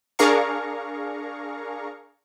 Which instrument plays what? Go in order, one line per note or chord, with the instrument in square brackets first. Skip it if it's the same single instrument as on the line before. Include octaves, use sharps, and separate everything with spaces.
[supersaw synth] D4 G#4 A#4 F5 A#5 C#6